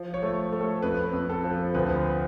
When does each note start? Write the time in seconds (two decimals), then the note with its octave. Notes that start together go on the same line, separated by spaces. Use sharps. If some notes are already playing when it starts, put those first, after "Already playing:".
Already playing: F3
0.14 C#5
0.22 A3
0.52 A3
0.61 A4
0.82 F2 B4
1.13 F2
1.29 A4
1.44 F3
1.74 D2 B4